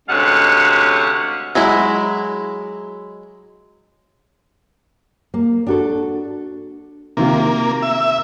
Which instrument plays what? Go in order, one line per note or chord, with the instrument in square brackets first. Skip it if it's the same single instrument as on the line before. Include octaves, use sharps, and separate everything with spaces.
[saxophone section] D2 C3 G#3 C#4 F5 F#5
[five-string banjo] F#3 G#3 E4
[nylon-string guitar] A#3
D4 F#4 A4
[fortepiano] C3 D#3 F4 [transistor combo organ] A#3
[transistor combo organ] E5